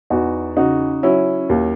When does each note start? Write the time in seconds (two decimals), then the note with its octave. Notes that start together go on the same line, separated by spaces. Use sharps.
0.10 E2 D#4 F#4
0.57 C#3 D#4 F#4
1.03 F#3 C#4 E4
1.49 D#2